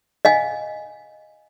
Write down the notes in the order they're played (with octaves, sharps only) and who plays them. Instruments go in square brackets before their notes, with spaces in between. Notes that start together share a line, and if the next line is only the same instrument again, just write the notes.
[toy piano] D#5 F5 G#5